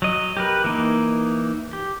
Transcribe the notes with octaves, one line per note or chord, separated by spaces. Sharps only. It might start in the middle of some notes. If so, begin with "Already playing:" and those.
F#3 D#5
G4 A#4 B4
E3 A#3 D#4
G4